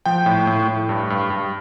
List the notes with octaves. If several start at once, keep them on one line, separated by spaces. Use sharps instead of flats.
F3 G5
A2
A2
A2
G2
G2
G2